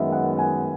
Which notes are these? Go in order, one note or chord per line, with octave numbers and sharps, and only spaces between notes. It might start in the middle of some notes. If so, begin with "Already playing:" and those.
Already playing: F#2 D#3 G#3 B3 E5
F#5
G#5